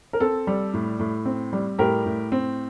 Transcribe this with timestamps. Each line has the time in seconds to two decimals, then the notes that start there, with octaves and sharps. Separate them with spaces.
0.13 A#4
0.20 C4 A4
0.47 G3
0.74 A2
0.99 A2
1.25 C4
1.53 G3
1.79 A2 G4 A#4
2.06 A2
2.32 C4